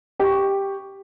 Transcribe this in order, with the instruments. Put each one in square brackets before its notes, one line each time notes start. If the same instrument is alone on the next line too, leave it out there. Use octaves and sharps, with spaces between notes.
[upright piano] G4 C#6